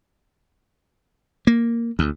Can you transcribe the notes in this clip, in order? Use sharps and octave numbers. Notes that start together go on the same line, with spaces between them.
A#3
D2